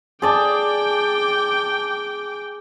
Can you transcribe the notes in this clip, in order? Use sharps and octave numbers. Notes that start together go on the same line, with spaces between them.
G#4 D5 G5 A5 D6